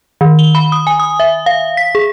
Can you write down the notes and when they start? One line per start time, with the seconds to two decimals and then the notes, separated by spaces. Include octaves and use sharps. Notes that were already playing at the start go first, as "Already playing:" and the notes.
0.21 D#3
0.39 G7
0.55 B5
0.72 D#6
0.87 G#5
1.00 D#6
1.20 E5
1.46 F5
1.77 B6
1.95 G#4